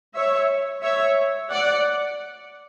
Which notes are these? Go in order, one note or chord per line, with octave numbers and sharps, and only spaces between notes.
C#5 E5
C#5 E5
D5 F#5